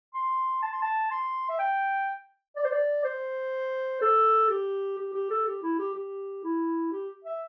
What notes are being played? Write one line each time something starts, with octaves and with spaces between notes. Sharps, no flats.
C6
A5
C6
A5
C6
E5
G5
D5
C5
D5
C5
A4
G4
G4
G4
A4
G4
E4
G4
G4
E4
G4
E5